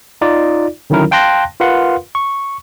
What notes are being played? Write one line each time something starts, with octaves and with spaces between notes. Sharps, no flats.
D#4 F4 D5
D3 D#3 F#3 C#4 E4 A#4
F5 G5 A5 C6 F#6 A#6
F4 A#4 B4 F5 F#5 C6
C#6